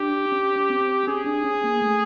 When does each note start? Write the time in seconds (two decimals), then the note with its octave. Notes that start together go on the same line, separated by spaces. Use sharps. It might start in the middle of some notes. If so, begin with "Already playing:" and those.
Already playing: D4 G4
0.32 C#4
0.60 C#4
0.70 C4
1.07 C#4 G#4
1.26 D4
1.44 C#4
1.64 A#3
1.82 A3